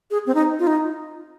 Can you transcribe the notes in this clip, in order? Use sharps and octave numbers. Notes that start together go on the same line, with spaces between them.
G#4
C4
D#4
F4
D#4